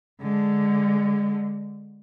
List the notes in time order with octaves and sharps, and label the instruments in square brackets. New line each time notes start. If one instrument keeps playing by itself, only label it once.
[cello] D3 G#3